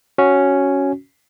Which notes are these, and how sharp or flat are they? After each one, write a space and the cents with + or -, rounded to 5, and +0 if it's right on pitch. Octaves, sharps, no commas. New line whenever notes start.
C#4 +0 F#4 +0